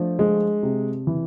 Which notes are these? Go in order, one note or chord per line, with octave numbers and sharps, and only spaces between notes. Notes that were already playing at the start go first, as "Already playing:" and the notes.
Already playing: F3 A3 D4
G#3
C3
E3